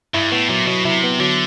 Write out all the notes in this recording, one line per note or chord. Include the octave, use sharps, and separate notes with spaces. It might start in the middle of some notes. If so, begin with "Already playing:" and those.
G2 E4
A2 B3
A#2 F#3
B2 F#3
C3 E4
B3
D3 F#3